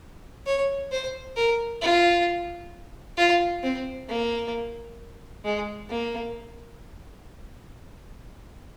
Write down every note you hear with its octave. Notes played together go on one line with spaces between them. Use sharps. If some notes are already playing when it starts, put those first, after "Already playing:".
C#5
C5
A#4
F4
F4
C4
A#3
G#3
A#3